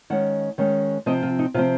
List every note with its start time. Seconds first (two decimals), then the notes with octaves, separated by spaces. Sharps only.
0.10 D#3 G#3 C#4 F#5
0.58 D#3 G#3 C#4
1.06 C3 F3 C4 D#5
1.23 F4
1.39 D#4
1.54 C3 F4
1.57 F3 C4